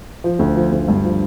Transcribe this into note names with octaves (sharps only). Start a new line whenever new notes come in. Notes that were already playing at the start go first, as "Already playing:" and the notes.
F3
D2
F3
D2
G2
F3